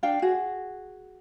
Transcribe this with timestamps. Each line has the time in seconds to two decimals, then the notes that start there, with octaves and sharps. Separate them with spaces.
0.03 D4 F5 G5
0.22 F#4 G#4